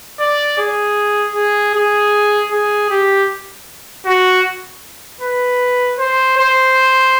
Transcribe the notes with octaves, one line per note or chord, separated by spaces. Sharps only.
D5
G#4
G#4
G#4
G#4
G4
F#4
B4
C5
C5